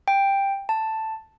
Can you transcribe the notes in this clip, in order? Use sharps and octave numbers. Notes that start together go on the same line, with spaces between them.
G5
A5